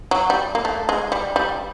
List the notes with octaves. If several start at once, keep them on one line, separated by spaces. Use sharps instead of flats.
F#3
G3
A#3
A3
G#3
G3
G3